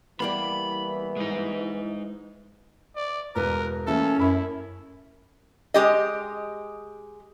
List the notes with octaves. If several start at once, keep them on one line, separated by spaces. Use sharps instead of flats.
E3 G3 A#3 B3 B5
G#3 D#4
D5
E1 A#4 B4 A#5
E3 A3 A#3 C#4 A4
F#2 E4 B5
G#3 G4 D#5